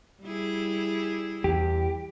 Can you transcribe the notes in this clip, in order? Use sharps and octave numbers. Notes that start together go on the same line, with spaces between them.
G3 E4 G#4
E2 G4